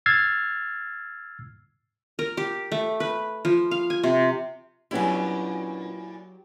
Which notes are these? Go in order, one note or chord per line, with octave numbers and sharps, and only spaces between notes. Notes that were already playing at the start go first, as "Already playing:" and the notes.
E6 F6 G#6 A6 C7
A#4
G4
A3
B4
F3
F5
G#5
C3
A#2 F#3 B3 C#4 D4 E4 G4